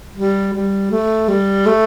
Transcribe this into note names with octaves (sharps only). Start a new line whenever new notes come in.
G3
G3
A3
G3
A3